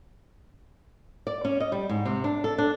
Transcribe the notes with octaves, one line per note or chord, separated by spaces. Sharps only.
D5
C#4
D#5
G3
G#2
C3
D4
A4
D4